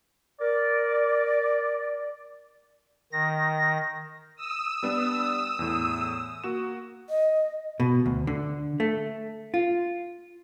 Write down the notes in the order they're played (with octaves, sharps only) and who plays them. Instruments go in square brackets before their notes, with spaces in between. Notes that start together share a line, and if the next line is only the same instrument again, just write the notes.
[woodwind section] A#4 D5
[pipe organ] D#3 A#6
[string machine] D#6 E6
[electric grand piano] G3 B3 D4
E2 A2
A#3 F#4 E7
[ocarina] D#5
[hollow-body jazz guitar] B2
D2
D3
A3
F4